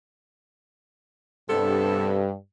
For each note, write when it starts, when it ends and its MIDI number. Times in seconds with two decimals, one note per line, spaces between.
1.49 2.32 43
1.49 2.23 48
1.49 2.23 59
1.49 2.23 69